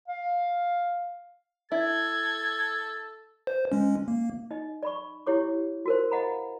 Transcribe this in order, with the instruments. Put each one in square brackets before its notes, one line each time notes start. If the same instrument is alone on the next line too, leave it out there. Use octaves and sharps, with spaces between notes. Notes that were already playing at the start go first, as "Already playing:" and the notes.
[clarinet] F5
[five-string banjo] E4 [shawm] A4 [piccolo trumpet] G#6
[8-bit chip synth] C5
G#3 C#4
A#3
[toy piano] D#4 D#5
D5 B5 C#6
E4 G4 C#5 D6
F#4 A#4 C5
D#5 F5 F#5 G#5 A#5 B5